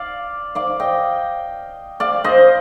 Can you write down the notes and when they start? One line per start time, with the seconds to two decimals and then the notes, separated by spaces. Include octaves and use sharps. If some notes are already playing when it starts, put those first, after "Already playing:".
Already playing: D5 F5
0.55 D5 F5
0.80 D#5 G5
2.00 D5 F5
2.24 C5 D#5